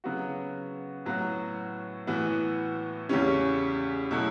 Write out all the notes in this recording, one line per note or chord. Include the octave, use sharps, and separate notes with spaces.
C#3 F#3 B3 F#4
A2 F#3 B3 F#4
A2 E3 B3 F#4
E2 C#3 G3 C#4
B2 F#3 A3 E4